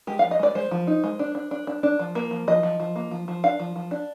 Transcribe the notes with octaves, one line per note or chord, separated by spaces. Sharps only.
G#3 G4
F5
F3
D#5
G#3 D5
G#3 C5
F3
D#4
G#3
D4
D4
D4
D4
D4
F3
A#3
F3
F3 D#5
F3
F3
A#3
F3
F3
D4 F5
F3
F3
D4